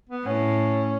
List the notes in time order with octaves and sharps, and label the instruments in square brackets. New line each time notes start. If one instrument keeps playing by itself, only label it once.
[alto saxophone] B3
[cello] A2 [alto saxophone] C#4